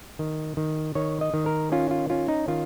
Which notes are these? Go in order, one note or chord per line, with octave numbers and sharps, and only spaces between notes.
D#3
D#3
D#3 C#5
D#5
D#3
A#4
C#4 F4
F4
C#4 F4
D#4
D#3 F4